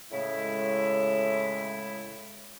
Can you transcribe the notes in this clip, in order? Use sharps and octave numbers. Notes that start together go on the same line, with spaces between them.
A2 C#3 G#3 E4